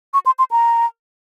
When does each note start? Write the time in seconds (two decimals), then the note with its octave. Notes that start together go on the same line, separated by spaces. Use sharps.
0.14 C#6
0.26 C6
0.39 C6
0.51 A#5